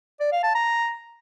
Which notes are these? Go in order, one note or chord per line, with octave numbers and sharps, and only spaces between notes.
D5
F5
A5
A#5